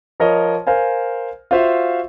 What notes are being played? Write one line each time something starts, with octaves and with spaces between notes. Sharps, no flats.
F3 A#4 C#5 D#5
A#4 C5 F5 G#5
F4 F#4 C5 E5 F5